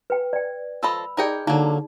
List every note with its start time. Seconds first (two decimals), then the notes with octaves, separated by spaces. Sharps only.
0.10 B4 G5
0.33 D5 G5
0.83 F3 A4 D#5 B5 E6
1.17 D#4 G#4 A#4 D5 D#5 G5
1.47 D3 F#3 A#3 D#4